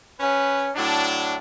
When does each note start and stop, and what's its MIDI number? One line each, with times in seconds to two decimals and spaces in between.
0.20 0.69 61
0.20 0.69 71
0.75 1.36 45
0.75 1.36 54
0.75 1.36 62